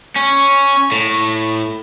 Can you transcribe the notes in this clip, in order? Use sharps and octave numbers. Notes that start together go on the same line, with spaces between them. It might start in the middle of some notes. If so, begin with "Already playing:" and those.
C#4
A2